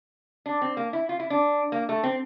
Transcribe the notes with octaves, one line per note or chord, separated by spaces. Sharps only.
D4
C4
A#3
E4
F4
E4
D4
A#3
A3
C4